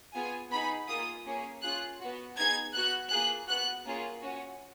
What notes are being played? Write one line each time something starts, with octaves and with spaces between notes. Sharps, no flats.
B3 F4 G#4 G#5
B3 D#4 G#4 B5
A#3 F4 G#4 D#6
A#3 C#4 G#4
C#4 F4 G#4 F#6
B3 F#4
B3 D#4 G#4 G#6
B3 F#4 F#6
A#3 F4 G#4 F#6
B3 F#4 F#6
A#3 C#4 F4 G#4
C#4 F#4